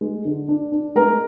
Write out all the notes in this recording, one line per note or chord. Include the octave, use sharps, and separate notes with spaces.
G#3
D3
D4
D4
G#3 A#4 A#5